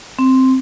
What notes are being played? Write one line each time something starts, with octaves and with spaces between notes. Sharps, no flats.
C4